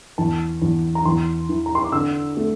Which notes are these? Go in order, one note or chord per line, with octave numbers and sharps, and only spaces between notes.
E2 A5
E2
A#5
E2 C6
E3
A#5
C6
D6
D3 E6
A3